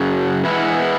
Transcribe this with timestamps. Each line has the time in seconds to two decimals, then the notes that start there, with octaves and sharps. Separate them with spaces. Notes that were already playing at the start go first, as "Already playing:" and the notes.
Already playing: F#2 C#3 F#3
0.45 E3 G#3 B3 E4